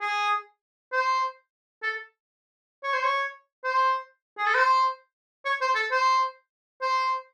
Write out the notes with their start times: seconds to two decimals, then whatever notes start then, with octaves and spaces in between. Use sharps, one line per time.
0.01 G#4
0.92 C5
1.83 A4
2.83 C#5
2.93 C5
3.04 C#5
3.64 C5
4.38 G#4
4.46 A4
4.55 C5
5.45 C#5
5.61 C5
5.75 A4
5.91 C5
6.82 C5